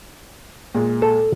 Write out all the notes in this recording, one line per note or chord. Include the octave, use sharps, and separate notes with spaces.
A#2 G#3
A4